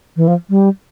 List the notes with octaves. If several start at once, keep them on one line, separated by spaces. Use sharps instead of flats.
E3
F3
G3